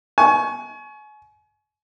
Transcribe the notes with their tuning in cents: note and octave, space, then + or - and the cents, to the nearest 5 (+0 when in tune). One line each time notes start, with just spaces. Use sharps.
G#5 +35 C#6 +0